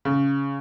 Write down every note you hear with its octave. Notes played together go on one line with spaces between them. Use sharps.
C#3